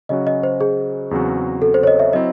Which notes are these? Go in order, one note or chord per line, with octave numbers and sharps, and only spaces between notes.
C#3 F#3 C#4 F#4 D#5
D#5
C5
G#4
E2 C#3 F#3 C4 F#4
A4
C5
C#5
D#5
E5
F#3 C4 E4 D#5